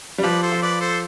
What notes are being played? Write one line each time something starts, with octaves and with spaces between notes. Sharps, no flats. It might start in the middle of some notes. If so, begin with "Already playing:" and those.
G3
F3 B4 D5
A4 C5
F3
B4 D5
A4 C5